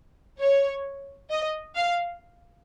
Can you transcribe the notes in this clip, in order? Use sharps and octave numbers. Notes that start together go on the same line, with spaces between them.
C#5
D#5
F5